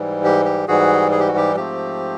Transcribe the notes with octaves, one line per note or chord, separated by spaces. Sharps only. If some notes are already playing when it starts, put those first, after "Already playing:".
Already playing: G#2 E3 G3
G4
G4
G#2 E3 G3 F#4 G#4
G#4
G4
F#4
G4
G#2 F3 A3 C4 G4